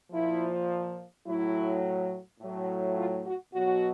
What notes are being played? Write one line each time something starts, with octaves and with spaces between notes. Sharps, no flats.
A#2 F3 E4
A2 F#3 E4
A2 F#3
F4
F#4
B2 F#3 F#4